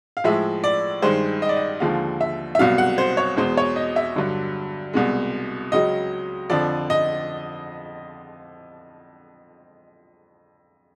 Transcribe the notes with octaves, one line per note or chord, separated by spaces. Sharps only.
F5
A2 F3 G#3 E5
D5
G2 D#3 G#3 C5
D#5
D5
D#5
D#2 D3 F3 G#3 F5
E5
E5
C2 B2 F#3 F5
F#5
C5
C#5
E2 B2 G#3 C5
C#5
D#5
E5
G2 D3 F#3
C2 B2 G#3
C#2 C#3 F#3 D#5
F2 D3 F3 D5
D#5